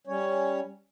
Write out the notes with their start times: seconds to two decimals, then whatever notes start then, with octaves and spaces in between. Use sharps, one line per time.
0.07 G3 C#4 C#5